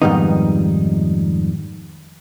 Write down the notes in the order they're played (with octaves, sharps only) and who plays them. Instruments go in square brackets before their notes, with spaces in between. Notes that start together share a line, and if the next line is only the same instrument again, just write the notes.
[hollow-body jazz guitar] F2 G#2 D#3 G3 B3 D#4